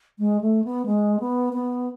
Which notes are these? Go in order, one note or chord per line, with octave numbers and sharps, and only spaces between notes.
G#3
A3
B3
G#3
B3
B3